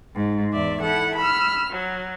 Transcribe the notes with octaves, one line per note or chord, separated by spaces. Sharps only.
G#2
E2 D5 E5
E4 A4 F#5
B5 E6 F6
F#3